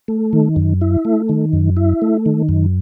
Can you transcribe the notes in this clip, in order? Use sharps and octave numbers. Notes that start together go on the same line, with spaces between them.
A3
D#3
F#2
E4
A3
D#3
F#2
E4
A3
D#3
F#2